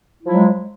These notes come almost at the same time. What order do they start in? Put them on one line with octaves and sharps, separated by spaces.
E4 F3 F#3 G#3